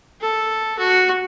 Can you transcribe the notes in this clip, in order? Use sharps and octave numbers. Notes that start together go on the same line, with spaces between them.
A4
F#4